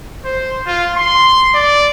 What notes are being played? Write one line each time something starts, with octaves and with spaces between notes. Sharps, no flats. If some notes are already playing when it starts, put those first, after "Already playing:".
C5
F4
C6
D5